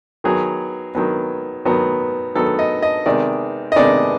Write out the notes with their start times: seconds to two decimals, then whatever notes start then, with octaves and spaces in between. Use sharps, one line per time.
0.24 D#3 F#3 B3 G#4
0.95 D#3 F#3 B3
1.65 D#3 F#3 B3
2.35 D#3 F#3 B3 A4
2.59 D#5
2.82 D#5
3.06 C3 D#3 G#3 B3 D5
3.72 D#5
3.76 C3 D#3 G#3 B3 D5